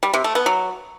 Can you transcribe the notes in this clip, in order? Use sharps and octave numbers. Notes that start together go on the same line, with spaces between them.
G3
C3
A3
B3
F#3